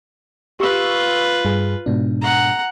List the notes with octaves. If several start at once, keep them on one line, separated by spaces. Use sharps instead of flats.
F4 G4 B4 C#6 E6
G2 G#4
G#2 B2 D4
F#5 A#5